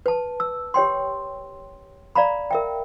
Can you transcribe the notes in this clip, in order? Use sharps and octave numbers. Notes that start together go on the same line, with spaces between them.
B4 A5
E6
G4 C#5 G5 C6
D5 F5 A#5 B5
A#4 E5 G5